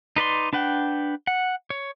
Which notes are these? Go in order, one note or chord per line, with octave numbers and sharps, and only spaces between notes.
D#4 B4 D5 C6
D4 B4 F#5 G5
F#5
C#5